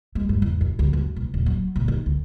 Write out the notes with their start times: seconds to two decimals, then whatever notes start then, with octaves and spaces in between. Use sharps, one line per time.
0.15 G#3
0.29 G2
0.42 E2
0.61 F#2
0.79 D2
0.93 F#2
1.16 B1
1.34 D#1
1.46 F#3
1.76 A#2
1.88 D#3
2.06 D2